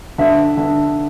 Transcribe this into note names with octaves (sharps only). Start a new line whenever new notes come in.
D3 E5
D3